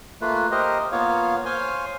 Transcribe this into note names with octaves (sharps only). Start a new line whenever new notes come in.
A3 A#3 F4 B4
G4 A#4 C5 D#5
A#3 B3 F4 C#5 F5
C5 C#5 F5 G#5 C6